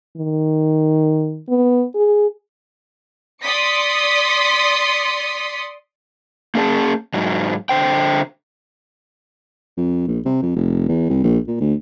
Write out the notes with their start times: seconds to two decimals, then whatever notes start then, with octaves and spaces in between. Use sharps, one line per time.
0.17 D#3
1.48 B3
1.95 G#4
3.43 D5 C6 D#6 B6 C#7
6.55 A#3 C#4 G#4 C#5 A5
7.14 G#2 F#3
7.69 D3 C5 G5
9.77 F2
10.07 A#1
10.25 C3
10.43 F2
10.56 F1
10.88 E2
11.10 C2
11.23 A#1
11.47 A#2
11.61 D2